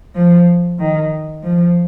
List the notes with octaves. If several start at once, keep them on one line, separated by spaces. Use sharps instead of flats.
F3
D#3
F3